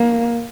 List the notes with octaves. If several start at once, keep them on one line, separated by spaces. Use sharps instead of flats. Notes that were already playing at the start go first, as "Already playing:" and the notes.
Already playing: A#3